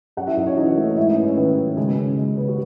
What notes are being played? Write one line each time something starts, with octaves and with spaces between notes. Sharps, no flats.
F#2 F#4 F#5
E4 E5
F#2 D#4 D#5
C#4 C#5
E3 D#4 D#5
A3
G#2 E4 E5
D#4 D#5
B3
C#4 C#5
D#3 B3 B4
F#3
C#3 G#3 G#4
C#3
G#3
B3
F#4